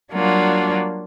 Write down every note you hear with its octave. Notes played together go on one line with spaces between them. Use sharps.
F#3 G3 A#3 D4 F4 F#4